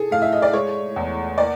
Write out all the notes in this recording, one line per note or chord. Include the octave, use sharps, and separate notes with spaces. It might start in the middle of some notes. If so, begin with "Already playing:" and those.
Already playing: G#4 A4
A2 F5
E5
D#5
D5
G#3 C#5
E2
A#3 D5